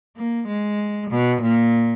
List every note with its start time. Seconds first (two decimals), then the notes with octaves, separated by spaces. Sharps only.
0.16 A#3
0.47 G#3
1.10 B2
1.42 A#2